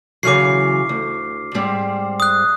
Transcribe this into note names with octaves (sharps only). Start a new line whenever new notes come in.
C#3 E3 F#3 D6 F6 C7
D2
G#2 G3 C4
D#6 F#6